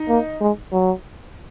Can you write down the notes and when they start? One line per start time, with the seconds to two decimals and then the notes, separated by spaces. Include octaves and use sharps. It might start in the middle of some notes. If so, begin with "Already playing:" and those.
Already playing: D#4
0.09 A#3
0.41 G#3
0.72 F#3